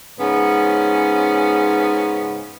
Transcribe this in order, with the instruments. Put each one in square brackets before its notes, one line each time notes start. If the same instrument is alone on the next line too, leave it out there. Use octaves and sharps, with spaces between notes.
[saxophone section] G#2 C#3 B3 C#4